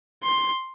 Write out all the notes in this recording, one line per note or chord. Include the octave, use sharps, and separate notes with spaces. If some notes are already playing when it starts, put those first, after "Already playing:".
C6